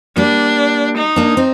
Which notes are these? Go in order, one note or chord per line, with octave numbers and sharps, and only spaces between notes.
G3 A#3 D4
D#4
A#3 D4
C4 D#4